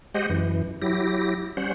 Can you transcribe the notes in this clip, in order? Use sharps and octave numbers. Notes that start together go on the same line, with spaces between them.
G#3 G4 C5 D#5 F#5
F#2 E3
F#3 E4 G4 A#6
G3 C#4 C5 F#5